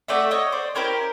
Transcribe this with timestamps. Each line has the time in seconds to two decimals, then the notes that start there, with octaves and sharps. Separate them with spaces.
0.08 A3 D4 F#4 D5 E5
0.31 C#5 D#5
0.52 C5 D5
0.75 C#4 E4 G4 A#4 C5